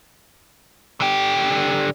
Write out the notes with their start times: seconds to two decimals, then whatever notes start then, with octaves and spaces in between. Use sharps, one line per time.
1.00 D3 G4